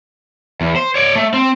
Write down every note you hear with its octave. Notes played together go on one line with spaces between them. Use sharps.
E2
C5
C#5 D5
A3
C4